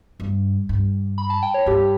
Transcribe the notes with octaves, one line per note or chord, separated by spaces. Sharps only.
G2
G2
B5
A5
G5
C#5
G2 G4